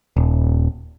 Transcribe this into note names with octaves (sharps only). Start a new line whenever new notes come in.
D#1